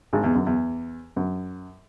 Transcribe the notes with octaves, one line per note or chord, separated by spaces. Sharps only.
G#1 G#2
E2
F#2
E2
F#2